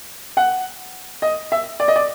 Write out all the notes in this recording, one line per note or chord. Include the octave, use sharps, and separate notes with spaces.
F#5
D#5
E5
D5
D#5
D5